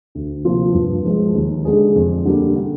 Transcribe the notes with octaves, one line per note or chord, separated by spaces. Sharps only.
D2
C3 F3 A#3 F4
G2
F3 G#3
D#2
D3 G#3 D4 G#4
F2
D3 G3 A#3
D3